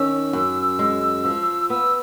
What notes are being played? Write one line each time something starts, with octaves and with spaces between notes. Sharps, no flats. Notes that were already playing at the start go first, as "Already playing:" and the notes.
Already playing: D#3 C#4 E6
F#2
G#3
F3
B3 E6